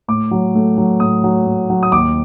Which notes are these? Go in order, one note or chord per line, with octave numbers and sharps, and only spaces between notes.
A2 D6
F#3
A3
F#3
A2 D#6
F#3
A2
F#3
D#6
D#2 D6